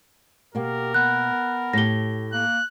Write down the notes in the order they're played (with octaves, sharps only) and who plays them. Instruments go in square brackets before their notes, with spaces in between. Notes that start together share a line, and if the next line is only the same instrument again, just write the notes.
[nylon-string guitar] B2 A#3 [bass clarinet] G4 [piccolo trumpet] A#4
[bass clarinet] B3 [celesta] F#6
[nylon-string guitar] A2 G4 [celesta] A#6 G7
[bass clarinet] A#3 [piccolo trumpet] F#6